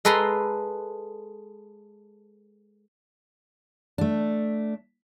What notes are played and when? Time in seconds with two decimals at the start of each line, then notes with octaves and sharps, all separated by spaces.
0.05 G#3 A4 B4 A#5 C6
3.98 A3 D4